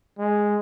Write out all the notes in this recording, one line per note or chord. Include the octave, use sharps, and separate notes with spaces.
G#3